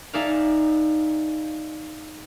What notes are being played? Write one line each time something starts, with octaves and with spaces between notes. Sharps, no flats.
D#4 G#4 D5 E5 F5